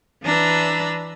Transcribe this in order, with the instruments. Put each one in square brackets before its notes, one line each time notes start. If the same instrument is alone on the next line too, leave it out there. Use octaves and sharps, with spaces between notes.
[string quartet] E3 D4 B4 A#5 E6